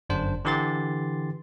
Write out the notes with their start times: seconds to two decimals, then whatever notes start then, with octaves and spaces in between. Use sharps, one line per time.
0.09 G1 F#2 D4 C5
0.45 D3 E3 G4 C6 A6